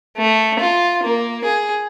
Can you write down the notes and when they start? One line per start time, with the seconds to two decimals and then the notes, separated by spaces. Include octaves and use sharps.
0.17 A3
0.59 F4
1.03 A#3
1.44 G#4